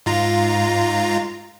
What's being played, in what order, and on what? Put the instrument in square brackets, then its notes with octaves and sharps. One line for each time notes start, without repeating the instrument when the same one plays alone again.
[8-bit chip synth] G#2 F4 A#5